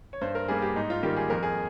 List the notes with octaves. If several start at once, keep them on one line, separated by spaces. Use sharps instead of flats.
C#5
G2 C5
A#4
G3 A#3 G#4
G4
G#2 D#4
F4
D#3 G3 A#3 G4
G#4
F2 A#4
G#4